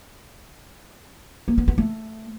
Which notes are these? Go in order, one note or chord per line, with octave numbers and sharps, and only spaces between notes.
A#3
B3
B3
A3